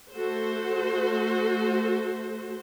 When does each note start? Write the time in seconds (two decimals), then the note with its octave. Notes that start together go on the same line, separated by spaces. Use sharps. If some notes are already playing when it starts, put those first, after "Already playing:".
0.14 A3 F#4 A4 C5